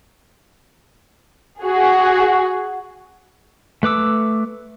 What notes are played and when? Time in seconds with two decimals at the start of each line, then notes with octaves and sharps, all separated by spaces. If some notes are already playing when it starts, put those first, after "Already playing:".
1.61 F#4 G#4
3.83 A3 B4 D6 E6